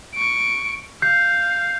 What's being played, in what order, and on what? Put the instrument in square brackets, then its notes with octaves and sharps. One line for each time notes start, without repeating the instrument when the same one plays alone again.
[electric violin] C#6 D7
[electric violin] F5 [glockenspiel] G6 C7